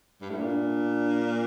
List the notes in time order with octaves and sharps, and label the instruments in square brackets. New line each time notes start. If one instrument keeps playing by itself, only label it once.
[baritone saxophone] G2
A2
[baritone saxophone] A#2 [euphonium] D4